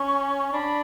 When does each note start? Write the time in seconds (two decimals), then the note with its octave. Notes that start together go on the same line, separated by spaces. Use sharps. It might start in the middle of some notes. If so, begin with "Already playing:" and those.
Already playing: C#4 C#6
0.53 D4 B5